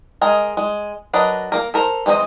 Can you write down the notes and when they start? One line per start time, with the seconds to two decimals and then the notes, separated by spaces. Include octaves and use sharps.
0.21 G#3 A#4 D#5 G#5
0.57 G#3
1.13 F#3 D4 A#4 B4 D#5
1.52 A#3 A#4
1.74 A4 A#4 C5
2.06 E3 G#3 C4 F4 D#5